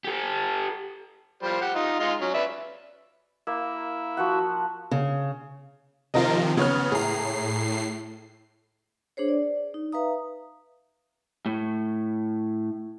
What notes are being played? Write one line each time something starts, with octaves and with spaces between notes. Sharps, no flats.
G4 A4
F3 G3 C5
G4 F#5
D#4 F4
G#3 D#4 F4
F#3 C#4
B4 D5 E5
A#3 E4
F3 F#4 F#5
C#3
C3 D#3 F3 F4 A#4 D#5
C#3 B3 C#5 F6
A2 G#4 A#5 C7
D4 G#4 C5 C#5
D5
D#4
B4 E5 F5 A#5 D#6
A2